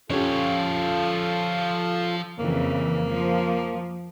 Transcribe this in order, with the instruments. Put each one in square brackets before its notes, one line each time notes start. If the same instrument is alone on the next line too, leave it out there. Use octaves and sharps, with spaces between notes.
[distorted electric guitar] F3 C#5 [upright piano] C#4 G4 [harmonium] F4 A4
[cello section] F2 C#3 E3 [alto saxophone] A#3
[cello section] F3